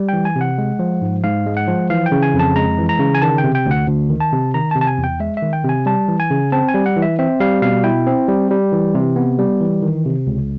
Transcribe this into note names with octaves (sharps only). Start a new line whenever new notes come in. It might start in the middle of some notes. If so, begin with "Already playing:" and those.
Already playing: G3
E3 G5
G#5
C3
F#5
G#3
F3
G#2
G#2 F5
G#3
F#5
F3
E3 F5
G5
C#3
G#5
F2
A5
G#3 A#5
E3
A#5
C#3
G#5
D#3 A5
G5
C3
G5
D2
F#5
D2
D#3
A5
C3
D#3 A#5
A5
C3
A5
G#5
E2
G5
G#3 E5
E5
D#3
G5
C3
G#5
G3 A5
E3
G#5
C#3
C4 A5
G#5
G3
F#5
E3
E5
C4 E5
G3 F5
B2 F5
E4 G5
C4
G3
G3
E3
C3
B3
G3
E3
D#3
C3
C#2